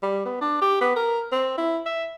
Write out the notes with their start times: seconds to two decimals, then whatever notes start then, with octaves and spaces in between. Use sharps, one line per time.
0.02 G3
0.25 B3
0.41 D4
0.62 G4
0.81 B3
0.96 A#4
1.32 C4
1.58 E4
1.86 E5